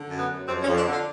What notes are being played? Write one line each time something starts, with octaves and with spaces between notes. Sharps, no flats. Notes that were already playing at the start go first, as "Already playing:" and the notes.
Already playing: D3
F#2
B3
F#2
F2 C4
C#4
F2
D4
D3 F4